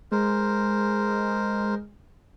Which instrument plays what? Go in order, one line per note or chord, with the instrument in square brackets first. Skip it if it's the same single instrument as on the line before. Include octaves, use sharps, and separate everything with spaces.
[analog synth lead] G#3 [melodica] A#4 C5